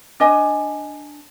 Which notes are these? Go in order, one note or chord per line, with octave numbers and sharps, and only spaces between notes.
D4 D#5 G#5